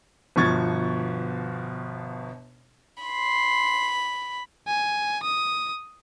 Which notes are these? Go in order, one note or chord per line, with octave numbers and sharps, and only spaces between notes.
G1 B2 F3 C#6 G#6 A6
B5 C6
G#5
D#6